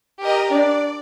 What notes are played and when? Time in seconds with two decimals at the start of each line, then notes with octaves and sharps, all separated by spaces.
0.21 G4 A#4 D#5
0.51 D4 D5